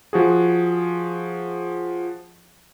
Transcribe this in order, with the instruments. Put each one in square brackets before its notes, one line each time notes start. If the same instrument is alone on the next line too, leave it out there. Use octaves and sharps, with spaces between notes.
[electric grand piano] F3 F#4 G#4